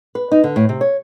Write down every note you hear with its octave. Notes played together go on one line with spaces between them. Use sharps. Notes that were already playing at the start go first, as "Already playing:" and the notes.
B4
D#4
D3
A2
C3
C#5